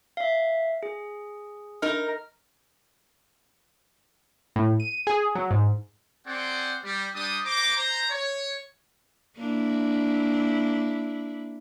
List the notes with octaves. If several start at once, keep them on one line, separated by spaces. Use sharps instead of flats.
E5 F5
G#4
D#4 A#4 F6
A2
D#7
G#4
F#3
G#2
C4 G#4 C5 D5 F#5
G3
G3 D4 G4 D#6
C5 A#5 D6
C5 A#5
C#5
A#3 D4 E4